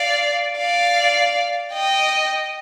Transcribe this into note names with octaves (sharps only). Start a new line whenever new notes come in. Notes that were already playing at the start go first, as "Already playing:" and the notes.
Already playing: D5 F5
D5 F5
D#5 G5